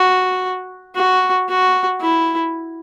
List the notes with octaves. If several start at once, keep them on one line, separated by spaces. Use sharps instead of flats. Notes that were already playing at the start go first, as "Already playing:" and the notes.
Already playing: F#4
F#4
F#4
E4